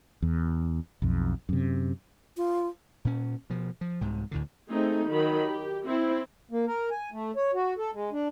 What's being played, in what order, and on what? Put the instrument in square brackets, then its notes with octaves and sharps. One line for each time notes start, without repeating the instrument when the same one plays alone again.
[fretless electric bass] E2
B1 F2
F#2 C3
[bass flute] F4
[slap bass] A#2 C#4
B2 F3
F3
C2 G#2 C3
D2 A2 D3
[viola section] A3 C4 D#4 G#4
D#3 F#3 B5
G4
C4 E4
[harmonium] A#3
A#4
G#5
A3
C#5
F#4
A4
G#3
D4